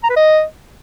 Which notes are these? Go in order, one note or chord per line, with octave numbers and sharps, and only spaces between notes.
A#5
B4
D#5